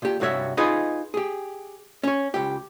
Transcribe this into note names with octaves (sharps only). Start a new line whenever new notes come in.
A#2 G4
C2 G2 F#4 C#5 E5
D#4 F4 G#4 B4 D#5
G4 G#4
C#4 C#5
C#2 G4